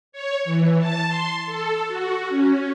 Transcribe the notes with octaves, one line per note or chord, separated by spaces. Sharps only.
C#5
E3
A5
C6
A4
F#4
C#4